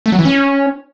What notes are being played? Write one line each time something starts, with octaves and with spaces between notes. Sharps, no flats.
A3
F#3
E3
C#4